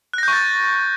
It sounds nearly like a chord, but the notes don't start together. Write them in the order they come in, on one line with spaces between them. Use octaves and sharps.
F#6 A#6 G6 C#6 A6